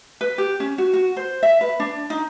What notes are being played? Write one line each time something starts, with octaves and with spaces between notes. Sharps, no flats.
B4
G4
C#4
F#4
F#4
C5
E5
B4
D4
D#4